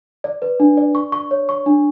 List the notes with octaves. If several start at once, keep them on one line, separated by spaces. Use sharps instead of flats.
D5
B4
D4
D5
C#6
C#6
C#5
C#6
D4